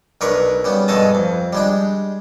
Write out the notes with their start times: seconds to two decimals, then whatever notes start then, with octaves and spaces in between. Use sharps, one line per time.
0.21 B1 D4 A#4 B4 C#6
0.64 C#3 G3 B3
0.88 G2 B2 G#3 A4 D#5 A5
1.15 F2
1.53 G3 G#3 D4